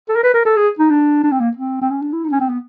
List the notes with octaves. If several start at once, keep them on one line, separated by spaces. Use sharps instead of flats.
A4
A#4
B4
A#4
A4
G#4
D#4
D4
D4
C4
A#3
C4
C4
C#4
D4
E4
D#4
D4
C#4
C4
B3